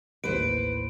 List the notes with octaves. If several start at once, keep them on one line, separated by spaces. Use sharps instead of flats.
A1 D#2 A2 B4 C5 D7